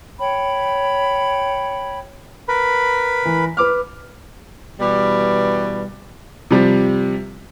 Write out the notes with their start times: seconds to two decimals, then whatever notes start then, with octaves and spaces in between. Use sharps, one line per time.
0.19 C#5 G5 B5
2.48 A#4 B4 B5
3.25 E3
3.57 B4 D6 F6
4.79 B2 E3 G3
6.51 C3 F3 G3